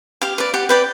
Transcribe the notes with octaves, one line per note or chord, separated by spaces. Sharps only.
G4 F5
B4 D5
G4 F#5
B4 D5 G5